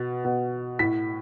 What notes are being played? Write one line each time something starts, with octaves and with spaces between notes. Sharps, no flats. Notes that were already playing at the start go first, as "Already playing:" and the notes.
Already playing: B2
B2
A2 B6